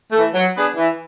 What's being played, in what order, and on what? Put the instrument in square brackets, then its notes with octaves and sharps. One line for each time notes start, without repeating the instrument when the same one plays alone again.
[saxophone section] E3 A3
F#3
B3 D4 G#4 B4
E3